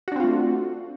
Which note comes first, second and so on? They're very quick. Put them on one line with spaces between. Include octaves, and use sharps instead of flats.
F#4 D4 C4 F4 A3